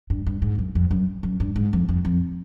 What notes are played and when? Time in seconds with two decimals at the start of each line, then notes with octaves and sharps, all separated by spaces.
0.10 G2
0.26 G2
0.42 G#2
0.55 F2
0.59 F#2
0.75 F2
0.91 F#2
1.23 F#2
1.40 G2
1.56 G#2
1.73 F2
1.89 F2
2.05 F2